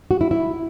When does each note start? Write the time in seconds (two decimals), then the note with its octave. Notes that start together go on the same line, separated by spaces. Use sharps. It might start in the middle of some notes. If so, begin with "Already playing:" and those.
0.11 F#4
0.21 E4
0.31 E4